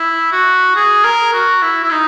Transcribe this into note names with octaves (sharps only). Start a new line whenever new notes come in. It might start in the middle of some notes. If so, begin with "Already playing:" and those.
Already playing: E4
F#4
G#4
A#4
F#4
E4
E4
D#4